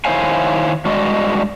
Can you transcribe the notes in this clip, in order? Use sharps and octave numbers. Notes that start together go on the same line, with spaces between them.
D#3 E4 C5 C#5 F5 G#5
G2 G#3 F#4 D5 D#5